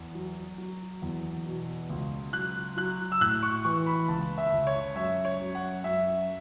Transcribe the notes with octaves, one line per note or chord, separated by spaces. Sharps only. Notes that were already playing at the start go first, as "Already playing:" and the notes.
Already playing: E2
F#3
F#3
E2
B2
C#2
F#3 F#6
F#3 F#6
E6
A2 F#6
C#6
E3 C#6
B5
C#2 A5
E5
C#2
C#5
F#2 E5
C#5
F#2
F#5
F#2 E5